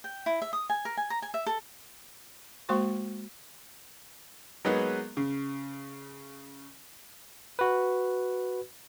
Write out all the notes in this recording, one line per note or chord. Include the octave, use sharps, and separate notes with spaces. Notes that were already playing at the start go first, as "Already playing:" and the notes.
G5
E4
E5
D#6
G#5
A#4
G#5
A#5
G#5
E5
A4
G#3 A#3 F#4 C5 C6 C#6
F#3 G#3 A#3 B3 D#4 B4
C#3
F#4 B4